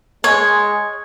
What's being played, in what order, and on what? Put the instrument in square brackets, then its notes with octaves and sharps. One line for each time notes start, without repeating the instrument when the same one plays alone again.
[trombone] G#3 [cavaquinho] C#5